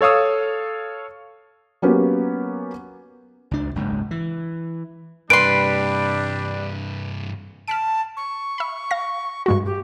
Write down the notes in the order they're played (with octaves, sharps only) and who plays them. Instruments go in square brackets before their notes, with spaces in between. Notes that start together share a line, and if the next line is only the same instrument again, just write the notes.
[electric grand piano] A4 C#5 F5 D#6 E6
[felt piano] F#3 A#3 B3 C#4 G4
[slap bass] C#2 D4
F#1 C#2 G#2
E3
[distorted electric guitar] G2 C3 [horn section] G3 D4 [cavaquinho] B4 C6 [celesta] D7
[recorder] A5 [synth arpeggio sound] F6 B6 D7
[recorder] C#6
[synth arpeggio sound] E5 B5
F5 A#6
[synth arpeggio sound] G2 G#3 F#4 [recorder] C#6
[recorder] G4